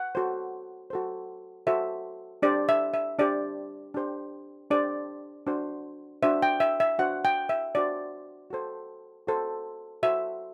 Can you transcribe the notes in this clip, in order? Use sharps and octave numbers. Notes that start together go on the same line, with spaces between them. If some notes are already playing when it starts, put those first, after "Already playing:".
Already playing: F#5
F#4 A4 C5
F#4 A4 C5
F#4 A4 C5 E5
D4 G4 C5 D5
E5
E5
D4 G4 C5 D5
D4 G4 C5
D4 G4 C5 D5
D4 F#4 C5
D4 F#4 C5 E5
G5
E5
E5
D4 F#4 C5 F#5
G5
E5
D4 F#4 C5 D5
F#4 A4 C5
F#4 A4 C5
F#4 A4 C5 E5